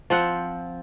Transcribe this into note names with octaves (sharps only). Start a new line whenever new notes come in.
F3 C4 F#5